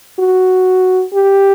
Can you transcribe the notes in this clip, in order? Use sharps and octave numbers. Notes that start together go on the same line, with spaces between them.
F#4
G4